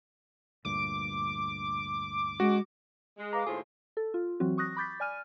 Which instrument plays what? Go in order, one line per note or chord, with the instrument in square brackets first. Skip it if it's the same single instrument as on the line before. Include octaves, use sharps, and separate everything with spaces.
[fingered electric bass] D2 G2 A#2 [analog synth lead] D6
[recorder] G#3 [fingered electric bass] C#4 [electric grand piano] F#4
[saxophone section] G#3
[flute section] B4 F5 D6 [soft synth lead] A#5
[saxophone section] D#2 A2 F4 [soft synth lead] G#4 [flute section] C5
[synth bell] A4
F4
E3 F#3 C4 F#4
C#6 D#6 F#6 A#6
B5 D6 G6 A6 B6
D5 G#5 F6 D#7